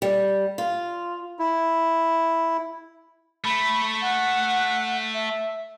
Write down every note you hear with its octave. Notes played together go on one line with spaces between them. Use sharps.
G3
F4
E4
A3 B5
F#5
E5